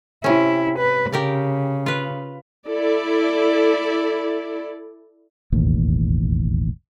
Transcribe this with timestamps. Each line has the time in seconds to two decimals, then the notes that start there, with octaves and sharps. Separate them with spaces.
0.24 C3 C#4 E4
0.79 B4
1.12 C#3 G4 A#4 D5
1.86 F4 B4
2.66 E4 A4 D5
5.52 E1 A1 D#2